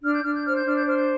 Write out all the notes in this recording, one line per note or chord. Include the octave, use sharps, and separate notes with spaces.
D4 F6
G6
D4 F6
G6
C5 F6
G6
D4 F6
G6
C5 F6
G6